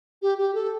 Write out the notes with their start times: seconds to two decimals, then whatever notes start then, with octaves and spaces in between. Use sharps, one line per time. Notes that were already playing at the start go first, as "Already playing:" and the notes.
0.22 G4
0.38 G4
0.55 A4